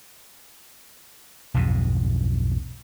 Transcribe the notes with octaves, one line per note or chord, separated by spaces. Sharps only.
B1 F2 G#2 B2